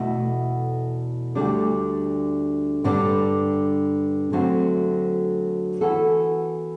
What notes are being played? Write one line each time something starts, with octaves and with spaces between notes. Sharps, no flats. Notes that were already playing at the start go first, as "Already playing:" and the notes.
Already playing: E2 B2 A3 E4 A4
D2 D3 G3 D4
G2 D3 G3 D4
D2 D3 F#3 A3 C4
E3 B3 F#4 A4